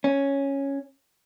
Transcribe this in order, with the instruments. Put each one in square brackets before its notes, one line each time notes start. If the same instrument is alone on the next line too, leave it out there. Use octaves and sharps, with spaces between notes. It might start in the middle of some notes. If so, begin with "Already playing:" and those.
[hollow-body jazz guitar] C#4